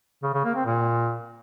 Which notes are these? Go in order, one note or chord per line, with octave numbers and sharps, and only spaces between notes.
C#3
C#3
A#3
C4
A#2